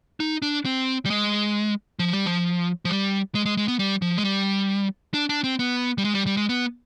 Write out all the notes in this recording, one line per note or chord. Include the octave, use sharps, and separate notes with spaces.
D#4
D4
C4
G3
G#3
F3
G3
F3
F3
G3
G#3
G#3
G#3
B3
G3
F3
G#3
G3
D4
D4
C4
B3
G3
G#3
G3
G3
G#3
B3